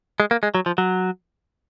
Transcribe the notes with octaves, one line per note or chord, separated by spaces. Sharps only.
G#3
A#3
G#3
F#3
F3
F#3